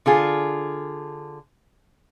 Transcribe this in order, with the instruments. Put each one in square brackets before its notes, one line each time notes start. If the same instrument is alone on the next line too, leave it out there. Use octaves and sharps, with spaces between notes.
[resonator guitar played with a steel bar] D3 F4 G#4